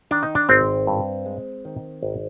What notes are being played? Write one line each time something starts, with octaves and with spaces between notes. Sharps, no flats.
D#3 D4
D#4
D4
G#1 C4
G2
G#3
D#3
G#1